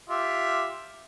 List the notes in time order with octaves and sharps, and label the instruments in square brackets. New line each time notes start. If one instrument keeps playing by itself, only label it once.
[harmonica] F4 G4 E5